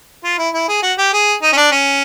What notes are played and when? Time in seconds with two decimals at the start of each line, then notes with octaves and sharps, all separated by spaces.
0.24 F4
0.38 E4
0.54 E4
0.68 G#4
0.82 F#4
0.98 G4
1.13 G#4
1.42 D#4
1.53 C#4
1.57 D4
1.71 C#4